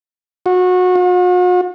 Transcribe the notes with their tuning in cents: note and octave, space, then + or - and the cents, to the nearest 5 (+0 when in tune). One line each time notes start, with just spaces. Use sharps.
F#4 -25
F#4 -45